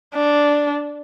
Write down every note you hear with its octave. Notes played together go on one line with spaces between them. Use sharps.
D4